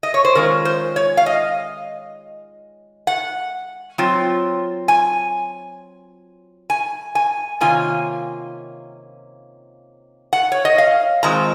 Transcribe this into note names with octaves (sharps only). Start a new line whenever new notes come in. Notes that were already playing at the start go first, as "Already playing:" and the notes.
D#5
C#5
C5
D#3 G#3 C#4 F4 A#4
C5
C#5
F5
D#5
F#5
F#3 C4 F4
G#5
G#5
G#5
C3 D#3 A#3 C#4 F4 G#5
F#5
C#5
D#5
F5
D#3 G#3 C4 F4 A#5